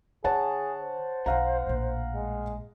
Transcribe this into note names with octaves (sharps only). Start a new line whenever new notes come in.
D3 G#4 C#5 F#5 A5
C5
B1 F5 F#5 A#5
A#1 A2
G#3